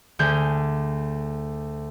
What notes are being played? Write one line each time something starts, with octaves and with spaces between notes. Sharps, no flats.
D2 D3 G#4 G6